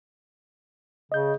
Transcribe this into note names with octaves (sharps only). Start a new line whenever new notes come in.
C#3 D#5 G6